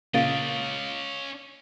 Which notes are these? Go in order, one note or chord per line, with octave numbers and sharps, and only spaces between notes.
A#2 C#3 A#3 C#4 D#5 F5 A6 D7